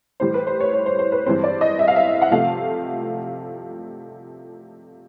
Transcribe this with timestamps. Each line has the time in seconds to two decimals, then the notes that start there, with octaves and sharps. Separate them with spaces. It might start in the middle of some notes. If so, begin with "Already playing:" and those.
0.20 A2 E3 G3 C5
0.34 B4
0.47 C5
0.60 C#5
0.73 C#5
0.86 C5
0.99 C5
1.12 B4
1.26 G2 E3 G#3 C4 C5
1.44 D5
1.61 D#5
1.79 E5
1.88 F5
1.96 E5
2.22 F#5
2.31 C3 F3 A3 F5